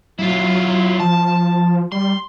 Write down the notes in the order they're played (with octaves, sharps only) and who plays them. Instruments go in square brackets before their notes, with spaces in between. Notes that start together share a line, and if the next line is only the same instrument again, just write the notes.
[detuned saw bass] F#3 [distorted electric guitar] E4 F4
[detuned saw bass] F3 [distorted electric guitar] A5
[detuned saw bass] G3 [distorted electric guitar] C6